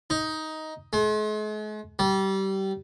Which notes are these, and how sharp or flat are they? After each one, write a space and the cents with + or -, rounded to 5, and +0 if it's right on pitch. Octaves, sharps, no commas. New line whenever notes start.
D#4 +10
G#3 +45
G3 -25